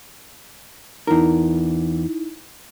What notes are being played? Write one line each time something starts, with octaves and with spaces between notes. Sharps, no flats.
E2 D#4 E4 A#4